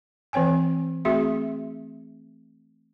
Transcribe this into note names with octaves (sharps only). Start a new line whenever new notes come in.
E3 C4 C#5 G5 G#5
A3 C4 F#4 G#4 E5 C6